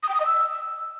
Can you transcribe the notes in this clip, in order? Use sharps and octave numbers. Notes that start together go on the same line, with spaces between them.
D#6
G5
D#6
D#5
E6